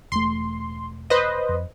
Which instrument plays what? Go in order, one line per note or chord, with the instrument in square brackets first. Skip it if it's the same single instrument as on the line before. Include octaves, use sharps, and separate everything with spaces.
[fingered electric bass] E1 A3 [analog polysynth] C6
[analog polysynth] B4 C5 D#5
[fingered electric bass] F2